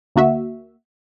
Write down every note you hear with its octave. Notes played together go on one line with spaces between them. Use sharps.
D2 A#3 F#4 E5